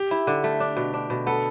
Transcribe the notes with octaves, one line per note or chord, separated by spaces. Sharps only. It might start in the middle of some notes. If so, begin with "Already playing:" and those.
Already playing: G4
E4
D3
A3
D4
B2
D4
B2
B3 A4